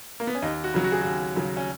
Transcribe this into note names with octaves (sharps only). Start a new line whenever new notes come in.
A#3
B3
C#4
D#2 D#4
F#4
C#3 F#3
F#4
G#4
D#2 F#4
C#3 F#3
C#4